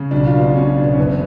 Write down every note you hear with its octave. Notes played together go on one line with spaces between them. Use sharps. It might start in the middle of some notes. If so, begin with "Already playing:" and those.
Already playing: C#3
B1 D4
F4
B2
D4
B2 C#4
B2 D4
C#4
F#1 B3